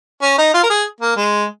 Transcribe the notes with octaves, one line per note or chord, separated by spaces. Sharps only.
C#4
D#4
F4
A#4
G#4
A#3
G#3